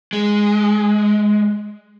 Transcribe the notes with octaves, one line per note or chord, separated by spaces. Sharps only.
G#3